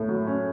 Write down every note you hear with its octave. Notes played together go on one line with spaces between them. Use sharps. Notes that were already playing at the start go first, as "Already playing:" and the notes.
Already playing: A2 A3
F#3
C#4